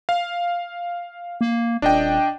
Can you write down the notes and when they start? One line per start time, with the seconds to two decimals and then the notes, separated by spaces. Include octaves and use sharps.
0.09 F5
1.41 A#3
1.82 D#1 D4 D#5 G5